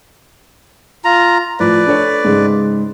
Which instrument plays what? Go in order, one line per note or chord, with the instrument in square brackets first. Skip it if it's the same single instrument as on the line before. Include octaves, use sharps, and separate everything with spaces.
[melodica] F4 A#5
[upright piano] A2 F3 [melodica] B4 D5
[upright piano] D4 A4 C#5
G#2 C#3 G#3